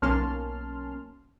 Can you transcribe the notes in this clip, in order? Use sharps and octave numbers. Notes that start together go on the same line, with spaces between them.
B1 A#3 C#4 A5 C6 F6